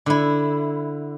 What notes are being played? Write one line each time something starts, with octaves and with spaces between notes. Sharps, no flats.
D3 E4